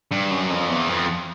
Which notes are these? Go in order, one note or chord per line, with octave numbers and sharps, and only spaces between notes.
G2
F#2
F2
E2
F2